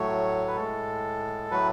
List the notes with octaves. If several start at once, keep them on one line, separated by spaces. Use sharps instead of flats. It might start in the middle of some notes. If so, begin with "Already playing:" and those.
Already playing: A2 F#3 A3 C#5
B4
A2 G#3 A4
A2 F#3 A3 B4